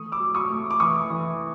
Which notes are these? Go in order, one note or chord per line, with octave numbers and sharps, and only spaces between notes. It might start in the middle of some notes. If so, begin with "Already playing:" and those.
Already playing: E3 A3 C#6 D#6
D6 E6
F#3
C#6 D#6
A3
D6
E3 C#6 D#6
E3